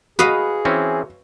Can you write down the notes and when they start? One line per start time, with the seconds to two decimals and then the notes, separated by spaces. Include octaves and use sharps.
0.19 F#4 G#4 B4 D#5 F5
0.65 E3 C4 C#4